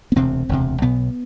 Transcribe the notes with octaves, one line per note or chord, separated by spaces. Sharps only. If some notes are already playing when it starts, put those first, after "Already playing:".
B3
E1 D2 C3 C4
E1 D2 C3
B1 B2 B3